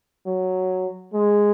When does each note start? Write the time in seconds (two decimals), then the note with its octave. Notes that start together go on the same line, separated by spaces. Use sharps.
0.26 F#3
1.13 G#3